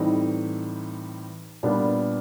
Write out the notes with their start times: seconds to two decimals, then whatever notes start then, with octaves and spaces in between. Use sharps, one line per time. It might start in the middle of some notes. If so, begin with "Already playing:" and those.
Already playing: A2 E3 G3 C4 D#4
1.63 A#2 G3 B3 D4